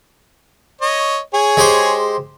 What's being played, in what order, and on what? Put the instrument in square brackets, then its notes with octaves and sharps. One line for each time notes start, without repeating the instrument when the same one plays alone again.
[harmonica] C#5 D#5
G#4 C#5
[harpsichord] G#3 G4 C5